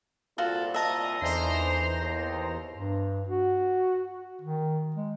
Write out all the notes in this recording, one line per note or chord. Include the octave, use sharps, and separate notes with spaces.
C2 A#2 F4 F#4 A4
D#5 E5 A5 A#5
E2 D3 E3 D#4 C5 A#5 C6
D#2
G2
F#4
D#3
G#3